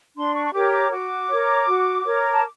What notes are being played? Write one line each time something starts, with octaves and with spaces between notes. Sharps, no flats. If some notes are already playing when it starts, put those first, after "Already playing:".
D4 C6
C#6
C#6
G4 A#4 C#5 D6
D6
F#4 D6
A#4 C#5
F#4
A#4 C#5
A5